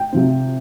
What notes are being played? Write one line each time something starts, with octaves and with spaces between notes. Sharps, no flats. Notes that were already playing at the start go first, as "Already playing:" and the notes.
Already playing: G5
C3 F3 C4